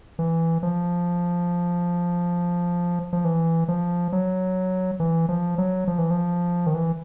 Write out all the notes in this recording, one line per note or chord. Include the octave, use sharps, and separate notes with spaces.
E3
F3
F3
E3
F3
F#3
E3
F3
F#3
F3
E3
F3
D#3
E3